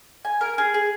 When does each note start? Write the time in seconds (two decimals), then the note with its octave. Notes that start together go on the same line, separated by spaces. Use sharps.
0.25 G#5
0.41 A#4
0.58 G#4
0.74 G#4